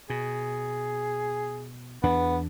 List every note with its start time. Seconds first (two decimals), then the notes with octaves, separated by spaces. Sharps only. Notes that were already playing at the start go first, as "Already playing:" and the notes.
0.10 B2 G#4
2.03 E2 B3 D4